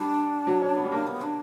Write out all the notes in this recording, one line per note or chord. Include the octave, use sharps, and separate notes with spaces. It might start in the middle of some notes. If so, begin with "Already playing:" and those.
Already playing: G3 D4
F#3
C#4
B3
G3
A#3
B3
D4